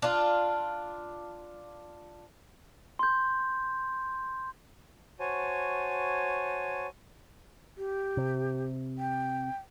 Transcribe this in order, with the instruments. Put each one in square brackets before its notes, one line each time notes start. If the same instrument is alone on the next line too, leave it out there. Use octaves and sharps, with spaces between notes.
[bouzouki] D4 F4
[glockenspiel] C6 G6
[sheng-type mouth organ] F#4 C5 C#5 G#5 A5
[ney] G4
[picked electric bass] C3
[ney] G5